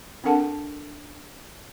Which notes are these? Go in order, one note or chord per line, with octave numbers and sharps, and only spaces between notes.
C4 D4 A4 A#4 F#5 A5